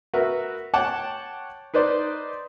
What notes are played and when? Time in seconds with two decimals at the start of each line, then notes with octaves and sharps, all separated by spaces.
0.14 F#4 A#4 B4 E5
0.74 C#5 F#5 G5 A5 D6
1.74 D#4 B4 C5 D5